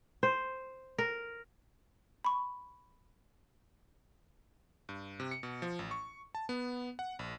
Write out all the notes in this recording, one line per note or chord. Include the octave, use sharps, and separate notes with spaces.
C5
A#4
B5 C#6
G2
C3
C#7
B2
F3
A1
C#6
A5
B3
F#5
A#1